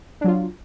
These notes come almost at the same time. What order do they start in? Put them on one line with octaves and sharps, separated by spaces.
D4 F#3 F4